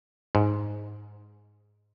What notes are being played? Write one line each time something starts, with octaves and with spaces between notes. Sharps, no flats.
G#2